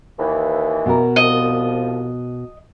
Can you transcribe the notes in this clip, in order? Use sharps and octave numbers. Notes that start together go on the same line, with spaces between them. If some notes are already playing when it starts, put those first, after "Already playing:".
D#2 E3
B2 A#4
C2 F3 D#5